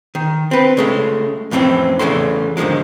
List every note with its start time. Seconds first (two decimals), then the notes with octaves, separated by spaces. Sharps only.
0.15 D#3
0.51 C4 B4
0.77 C#3 G#3 A3
1.51 F2 A2 E3 G3 C4 C#4
1.99 E2 C#3 E3 A3 C6
2.57 G#2 D3 D#3 F3 G#3